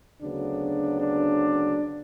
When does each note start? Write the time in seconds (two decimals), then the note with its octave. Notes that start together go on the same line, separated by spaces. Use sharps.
0.22 D2 C#3 F#3 B3 D4
1.01 D4